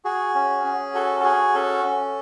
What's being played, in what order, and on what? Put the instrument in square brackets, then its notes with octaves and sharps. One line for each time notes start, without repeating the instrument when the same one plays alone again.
[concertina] F#4 G#4
C#4
C#4
F#4 A4
A4
F#4 G#4
C#4 A4
C#4